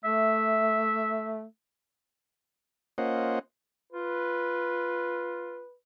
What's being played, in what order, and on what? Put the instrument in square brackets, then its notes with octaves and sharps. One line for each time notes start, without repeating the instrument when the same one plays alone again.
[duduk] A3 [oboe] E5
[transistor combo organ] A#3 C#4 F4 C5 D#5 F#5
[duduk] F4 [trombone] B4